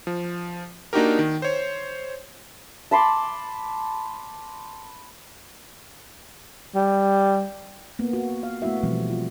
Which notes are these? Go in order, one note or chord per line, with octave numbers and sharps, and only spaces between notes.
F3
A#3 D4 D#4 F#4 G4 A#4
D#3
C5 C#5
A5 B5 C6 D6
G3
A#3 B3
F#4
F5
A3 B3 E4 F#4 E5
B2 E3 F3 G3 A3 C4
F4